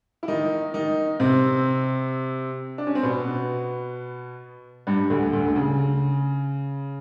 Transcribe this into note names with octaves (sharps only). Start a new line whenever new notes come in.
E4
D#3 D#4
D#3 D#4
C3 C4
D4
C#4
C4
B2 B3
G2 G3
D2 D3
D2 D3
C#3